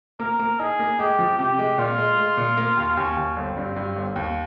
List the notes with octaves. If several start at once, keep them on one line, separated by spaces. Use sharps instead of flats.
A#3 A#4
A#3
D#4 G#4
A#3
G#3 G4
F3
C3 G4
G#3
A#2 F4
G#3
G#3
A#2
A#3
D#2
D#2 C#4
D#2
G1 C4
G2
G2
G1
D#2